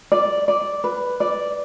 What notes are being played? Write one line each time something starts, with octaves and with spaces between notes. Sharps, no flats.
D5
D5
B4
D5